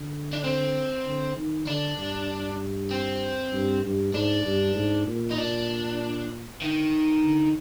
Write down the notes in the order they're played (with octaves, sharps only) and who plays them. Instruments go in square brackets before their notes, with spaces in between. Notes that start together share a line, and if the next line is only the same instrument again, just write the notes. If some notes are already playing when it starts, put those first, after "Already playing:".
Already playing: [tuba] D3
[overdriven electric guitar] D4
C4
[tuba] D3
D#3
[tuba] D3 [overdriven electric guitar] D4
[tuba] G2
[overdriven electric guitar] C4
[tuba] G2
G2
[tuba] G#2 [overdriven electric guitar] D4
[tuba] G2
G#2
A#2
[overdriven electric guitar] D#4
[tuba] A#2 [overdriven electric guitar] D4
[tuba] D3 [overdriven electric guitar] D#3
[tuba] D3